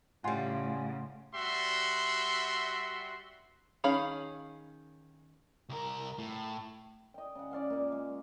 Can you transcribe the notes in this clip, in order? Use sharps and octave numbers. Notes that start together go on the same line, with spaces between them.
A2 C#3 G3 F4 F#5 G#5 C6
G3 F#4 E5 C6
D#3 C#4 G#4 F5 B5
C2 A#4
A2
D#5 G5
C#3 F#5
C#4 D5 F5 F#5
A#2 D#5
G#3